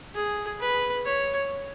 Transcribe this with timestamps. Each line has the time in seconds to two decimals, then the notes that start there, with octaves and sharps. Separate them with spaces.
0.15 G#4
0.60 B4
1.05 C#5